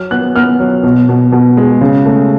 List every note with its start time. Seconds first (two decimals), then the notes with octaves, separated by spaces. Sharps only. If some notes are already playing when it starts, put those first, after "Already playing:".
Already playing: F#3 F6
0.11 B3 F#6
0.36 B3 F6
0.60 F#3
0.83 B2
1.09 B2
1.32 B2
1.57 G#3
1.81 C#3
2.06 A3